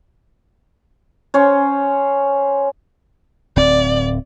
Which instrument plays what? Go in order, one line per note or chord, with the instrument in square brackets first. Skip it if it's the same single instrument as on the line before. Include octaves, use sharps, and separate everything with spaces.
[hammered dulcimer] C#4 C5 C#5
[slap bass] D1 C4 [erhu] D5